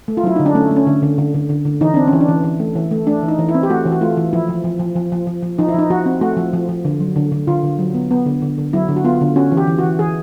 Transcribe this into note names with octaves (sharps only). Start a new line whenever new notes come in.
A3
F4
F#3 E4
D3 D#4
D4
A3 C#4
A3
C#4
D3
D3
D3
D3
D3
D3
E3 D#4
C4 D4
C#4
E3
D4
E3
E3
A3
E3
A3
A3 D4
E3
D#4
E3
E4
C4
G4
A3 F#4
E3
F#4
A3 F4
E3
F3 E4
F3
F3
F3
F3
F3
F3
F3
F3 D#4
E4
F3 D#4
F3 F#4
C4
A3 F#4
F3
F3
F3
D3
F#3
D3
D3
D3 F4
D3
F#3
B3
B3
D3
D3
D3
F#3 E4
D3
F#4
B3 F4
D3
C#4 F#4
E3
G4
E3
F#4
E3
E3 G#4